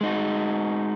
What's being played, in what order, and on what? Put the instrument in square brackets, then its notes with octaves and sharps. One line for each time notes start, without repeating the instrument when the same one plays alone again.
[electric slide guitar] G#3 D#4 F#4